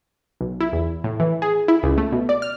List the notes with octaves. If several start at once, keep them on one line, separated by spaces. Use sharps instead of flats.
B1
E4
E2
A2
E3
G#4
E4
C#2
A3
B2
D5
F6